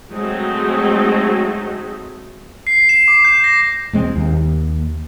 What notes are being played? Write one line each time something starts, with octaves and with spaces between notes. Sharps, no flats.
F#3 G#3 A3 C4 D#4
C7
E7
D6
G6
A#6
E1 G#3 C4
D#2